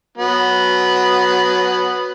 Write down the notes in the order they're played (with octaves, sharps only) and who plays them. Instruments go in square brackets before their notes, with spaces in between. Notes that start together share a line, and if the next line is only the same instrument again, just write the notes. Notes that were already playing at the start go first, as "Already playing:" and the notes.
[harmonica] F#3 B3